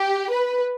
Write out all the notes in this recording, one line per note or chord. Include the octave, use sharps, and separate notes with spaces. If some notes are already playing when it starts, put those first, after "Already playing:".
Already playing: G4
B4